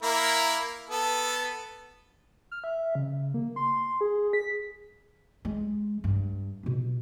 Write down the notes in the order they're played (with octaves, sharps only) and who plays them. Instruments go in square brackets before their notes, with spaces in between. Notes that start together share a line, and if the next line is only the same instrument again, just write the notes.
[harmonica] A#3 E4 A#4
B3 A4
[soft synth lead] F6
E5
C#3
A#3
C6
G#4
B6
[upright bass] G#3
G2
B2 F4